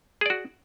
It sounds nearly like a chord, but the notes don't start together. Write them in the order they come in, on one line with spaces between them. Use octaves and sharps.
G#4 D5 F#4